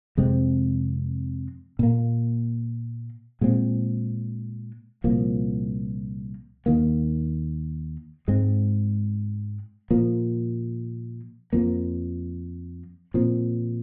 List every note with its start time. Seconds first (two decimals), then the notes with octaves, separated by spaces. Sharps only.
0.17 F2 C3 G#3 C4
1.79 A#2 A#3
3.41 A#2 G#3 C4
5.04 C2 A#2 F3 A#3
6.66 D#2 D#3 A#3
8.28 G#2 G#3 C4
9.91 A#2 F3 A#3
11.53 F2 F3 A#3
13.14 A#2 F3 C4